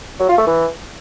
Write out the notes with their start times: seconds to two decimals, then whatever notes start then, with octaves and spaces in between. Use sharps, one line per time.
0.20 F#3
0.29 F4
0.38 A3
0.47 E3